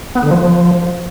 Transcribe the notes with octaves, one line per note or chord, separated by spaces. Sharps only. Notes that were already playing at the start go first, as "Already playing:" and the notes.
B3
D3
F3